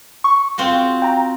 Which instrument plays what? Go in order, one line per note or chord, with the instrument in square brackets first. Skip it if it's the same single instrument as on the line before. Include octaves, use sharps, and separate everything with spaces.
[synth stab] C#6
[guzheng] C4 F4 F#4
[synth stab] G5 A#5